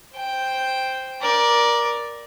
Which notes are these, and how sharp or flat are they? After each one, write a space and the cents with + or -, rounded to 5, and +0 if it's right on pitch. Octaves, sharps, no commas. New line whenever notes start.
C5 +0 G5 +0
A#4 +20 D5 +0